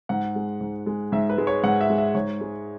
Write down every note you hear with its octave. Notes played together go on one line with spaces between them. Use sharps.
G#2 F#5
G#3
G#2
G#3
G#2 E5
B4
G#3
C#5
G#2 F#5
E5
G#3
E5
G#2 C#5
G#3